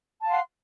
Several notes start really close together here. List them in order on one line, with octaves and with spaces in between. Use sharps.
A5 F5 C6 F#5